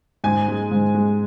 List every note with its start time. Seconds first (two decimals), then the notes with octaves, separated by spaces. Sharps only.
0.24 G#2 G#5
0.48 G#3
0.71 G#2
0.95 G#3